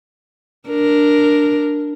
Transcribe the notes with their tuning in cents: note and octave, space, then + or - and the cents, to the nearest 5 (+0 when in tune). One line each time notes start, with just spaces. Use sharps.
D4 +0 A#4 +0